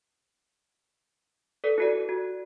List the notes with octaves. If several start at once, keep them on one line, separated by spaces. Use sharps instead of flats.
A4 B4 D5
E4 F#4 D5
F#4